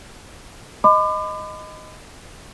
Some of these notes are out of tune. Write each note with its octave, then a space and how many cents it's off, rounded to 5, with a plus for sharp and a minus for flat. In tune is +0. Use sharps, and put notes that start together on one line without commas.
D#5 +0 B5 +35 D6 +35